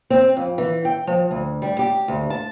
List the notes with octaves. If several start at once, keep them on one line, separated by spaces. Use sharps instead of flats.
C4
F2
E3
G5
F3
D2
G3
G4
D2
A5